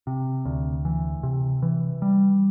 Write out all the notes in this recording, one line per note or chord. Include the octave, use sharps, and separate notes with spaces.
C3
D2
E3
C3
E3
G3